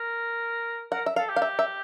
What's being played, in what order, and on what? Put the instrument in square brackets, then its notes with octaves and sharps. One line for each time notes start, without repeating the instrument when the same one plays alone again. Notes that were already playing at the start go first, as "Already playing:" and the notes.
Already playing: [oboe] A#4
[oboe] A#4 [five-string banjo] F#5
[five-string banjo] E5
[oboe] A4 [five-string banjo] F5
[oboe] G4
[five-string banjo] F5
E5
E5